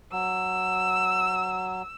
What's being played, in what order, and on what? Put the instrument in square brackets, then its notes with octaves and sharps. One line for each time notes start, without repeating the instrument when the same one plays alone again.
[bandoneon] F#3 [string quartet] E6